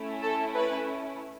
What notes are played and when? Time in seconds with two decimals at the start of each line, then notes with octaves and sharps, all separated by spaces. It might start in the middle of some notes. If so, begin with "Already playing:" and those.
Already playing: A3 C#4 E4
0.23 A4
0.55 B4